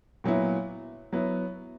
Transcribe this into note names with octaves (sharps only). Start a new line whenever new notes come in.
A#2 F#3 B3 E4
F#3 B3 E4